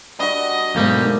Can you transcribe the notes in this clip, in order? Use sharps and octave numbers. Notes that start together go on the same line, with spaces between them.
G3 D4 F#4 D#5
B1 G#2 G3 A3 A#3